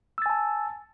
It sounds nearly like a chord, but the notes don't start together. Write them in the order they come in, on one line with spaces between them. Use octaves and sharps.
E6 A6 G#5 A5